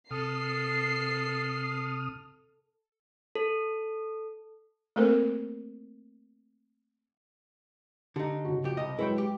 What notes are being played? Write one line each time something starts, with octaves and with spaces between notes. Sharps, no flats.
C3 A4 D#6 F6 C7
A4
A3 A#3 C4 A4 A#4 C5
D3 D#4 G4
C#3 F#4
F2 G4
C2 D#5
F#3 G#3 E4 B4 C#5 G5
G4